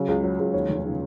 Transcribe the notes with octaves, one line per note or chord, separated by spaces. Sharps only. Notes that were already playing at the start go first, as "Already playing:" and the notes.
Already playing: C#3 F#3
C#2
F#3
C#2
D#2 C#5
F1
C#3